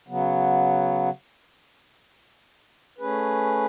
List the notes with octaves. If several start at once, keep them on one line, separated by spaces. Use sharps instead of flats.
C#3 F#3 B3
A3 C#4 G#4 B4